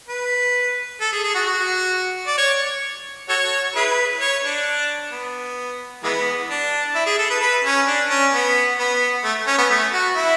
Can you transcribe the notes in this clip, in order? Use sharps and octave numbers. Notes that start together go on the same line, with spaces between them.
B4
A4
G#4
G#4
F#4
F#4
D5
C#5
F#4 A4 C#5
E4 G#4 B4
C#5
D4
B3
E3 G#3 B3
D4
E4
G#4
A4
B4
B4
C#4
D4
C#4
B3
B3
A3
C#4
B3
A3
F#4
E4